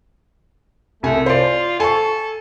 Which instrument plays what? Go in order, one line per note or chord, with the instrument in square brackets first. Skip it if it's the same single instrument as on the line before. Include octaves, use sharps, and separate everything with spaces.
[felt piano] C2 G#5 [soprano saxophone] A3
[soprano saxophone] F4 [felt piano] C5 D5
[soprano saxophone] A4 [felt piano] G#5 C#6